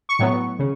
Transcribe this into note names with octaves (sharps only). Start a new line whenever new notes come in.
C#6
A2 F#3 B3
C#3